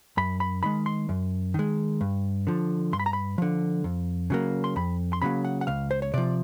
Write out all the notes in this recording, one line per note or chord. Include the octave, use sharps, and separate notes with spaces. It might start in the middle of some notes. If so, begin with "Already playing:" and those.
F#2 B5
B5
D#3 G#3 B5
C6
F#2
D#3 G#3
G2
D3 F3
G2 C6
B5
A#5
B5
D3 F3
F2
C#3 F#3 A#3
C6
F2 B5
C6
C#3 F#3 A#3 B5
F#5
F#5
C#2 F5
C5
C#5
C3 F3 D5